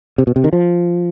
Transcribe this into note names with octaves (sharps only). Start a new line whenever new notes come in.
C3
B2
C3
D#3
F3